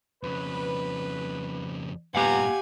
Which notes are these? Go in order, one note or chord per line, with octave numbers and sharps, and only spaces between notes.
F2 C#3 B4
G2 A#2 B3 G4 F5 F#5 G#5 A#5